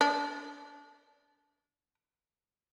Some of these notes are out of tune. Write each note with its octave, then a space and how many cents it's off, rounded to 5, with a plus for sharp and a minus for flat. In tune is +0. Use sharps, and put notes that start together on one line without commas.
D4 -25